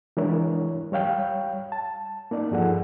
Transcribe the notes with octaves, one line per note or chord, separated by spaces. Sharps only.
E3 G#3 D4 E4 A#4 C#5
G3 C#5 F5 G5
A5
A#3 D#4 D5
G2 F3 G#4 A4 F#5